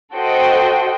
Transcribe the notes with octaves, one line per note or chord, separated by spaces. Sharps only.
F#4 A4 C5 D#5 G5